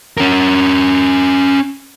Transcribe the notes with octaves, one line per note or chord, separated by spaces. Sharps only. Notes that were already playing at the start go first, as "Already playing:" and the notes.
C#4 A#4